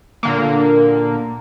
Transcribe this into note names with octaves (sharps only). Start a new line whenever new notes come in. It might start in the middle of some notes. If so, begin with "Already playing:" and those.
A#2 D3 A#3